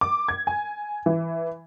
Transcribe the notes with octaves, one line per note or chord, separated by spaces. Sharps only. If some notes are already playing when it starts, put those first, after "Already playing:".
D6
G#6
G#5
E3